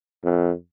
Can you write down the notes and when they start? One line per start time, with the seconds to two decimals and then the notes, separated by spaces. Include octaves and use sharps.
0.24 F2